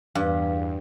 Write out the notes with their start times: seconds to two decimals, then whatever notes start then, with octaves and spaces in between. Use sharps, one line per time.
0.15 E2 G2 F5